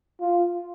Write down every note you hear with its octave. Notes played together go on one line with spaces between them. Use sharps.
F4